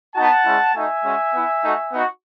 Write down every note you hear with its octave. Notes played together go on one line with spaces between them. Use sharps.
B3 D#4 F#4 F#5 A5
G#3 C#4 E4
A3 D#4 F#4 E5 G#5
G#3 C#4 F#4
B3 E4
A3 D#4 F#4
B3 D#4 F#4